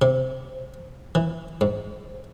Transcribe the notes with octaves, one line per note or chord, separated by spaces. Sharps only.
C3
E3
G#2